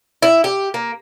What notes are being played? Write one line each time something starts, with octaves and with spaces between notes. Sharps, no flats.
E4
G4
A#3